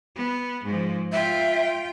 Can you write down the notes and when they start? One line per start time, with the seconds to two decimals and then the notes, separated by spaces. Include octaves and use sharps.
0.16 B3
0.65 G#2 F3
1.12 F4 E5 G5